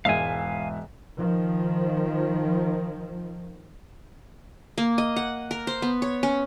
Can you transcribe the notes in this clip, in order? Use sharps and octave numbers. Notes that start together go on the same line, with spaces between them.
E1 G#2 E5 F5 G#5
D#3 F3
A#3
D#5
F#5
A#4
C5
B3
C#5
C#4